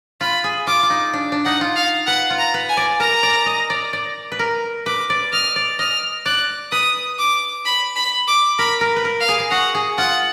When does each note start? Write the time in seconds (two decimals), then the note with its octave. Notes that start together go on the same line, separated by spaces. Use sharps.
0.21 F4 B5
0.44 G#4
0.67 F4 D6
0.83 F4
0.90 D#4
1.13 D4
1.32 D4
1.45 D#4 F#5
1.61 F4
1.76 F5
2.07 B4 F#5
2.30 F4
2.38 A#5
2.54 B4
2.69 G#5
2.77 D5
3.00 A#4 A#5
3.23 D5
3.46 D#5
3.70 D5
3.93 D5
4.32 B4
4.39 A#4
4.86 B4 D6
5.10 D5
5.33 D#5 F6
5.56 D5
5.79 D#5 F6
6.26 D5 F#6
6.72 B4 D#6
7.19 D6
7.65 B5
7.96 B5
8.28 D6
8.58 A#4 B5
8.81 A#4
8.96 B4
9.05 A#4
9.21 F5
9.29 G#4
9.40 G#4
9.51 F#4 F#5
9.75 G#4
9.98 F4 F#5